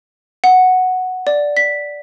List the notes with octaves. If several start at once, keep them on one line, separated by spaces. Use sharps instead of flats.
F#5
D5
B6